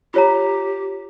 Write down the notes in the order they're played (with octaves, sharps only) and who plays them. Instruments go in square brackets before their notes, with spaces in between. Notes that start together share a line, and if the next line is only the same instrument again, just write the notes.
[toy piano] F4 C#5 A#5 [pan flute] G4